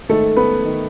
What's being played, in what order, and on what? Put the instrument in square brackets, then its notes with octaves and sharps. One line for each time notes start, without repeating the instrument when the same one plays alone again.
[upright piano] G#2 D#3 A3 A4
B3 B4
D#3